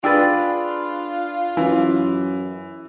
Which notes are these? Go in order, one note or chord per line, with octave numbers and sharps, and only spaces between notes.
D4 F4 G#4 B4 G5 E6 A6
F#2 E3